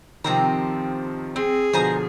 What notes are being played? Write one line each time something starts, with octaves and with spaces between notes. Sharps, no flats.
C3 D#3 F3 C4 A#5
C4 G#4
B2 D3 F3 C5 G#5 A#5